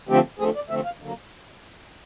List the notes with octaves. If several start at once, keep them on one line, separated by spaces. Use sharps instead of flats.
D3 F3 A3 C4 G4
D3 F3 A3 C4 G#4
D5
D3 F3 A3 C4 E5
F5
D3 F#3 A#3